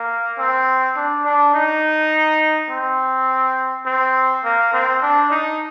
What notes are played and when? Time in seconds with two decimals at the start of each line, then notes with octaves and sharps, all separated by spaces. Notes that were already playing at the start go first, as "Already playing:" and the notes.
Already playing: A#3
0.38 C4
0.97 D4
1.25 D4
1.54 D#4
2.70 C4
3.86 C4
4.44 A#3
4.73 C4
5.02 D4
5.31 D#4